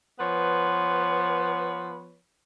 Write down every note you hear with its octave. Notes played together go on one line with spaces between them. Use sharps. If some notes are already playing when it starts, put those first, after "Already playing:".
F3 B3 B4 C#5